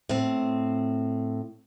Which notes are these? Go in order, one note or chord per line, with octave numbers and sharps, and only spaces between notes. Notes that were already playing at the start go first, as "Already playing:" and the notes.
A2 C4